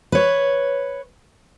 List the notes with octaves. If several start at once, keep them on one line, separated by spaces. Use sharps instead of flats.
B4 C#5